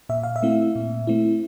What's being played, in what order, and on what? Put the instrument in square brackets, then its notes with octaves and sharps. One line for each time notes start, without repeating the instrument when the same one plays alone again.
[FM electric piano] A#2 E5
F5
E5
A3 C4 E4
A#2
A3 C4 E4